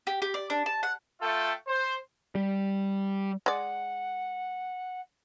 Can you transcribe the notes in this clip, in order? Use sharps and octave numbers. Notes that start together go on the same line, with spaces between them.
G4
G4
D5
D4
A5
F#5
A3 F4 A4 E5 G5
C5
G3
G#3 D5 F#5